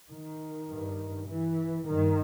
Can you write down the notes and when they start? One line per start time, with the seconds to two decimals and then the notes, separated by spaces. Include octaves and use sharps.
0.09 D#3
0.68 G2
1.27 E3
1.87 G2 D#3